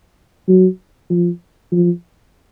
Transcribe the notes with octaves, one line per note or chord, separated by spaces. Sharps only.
F#3
F3
F3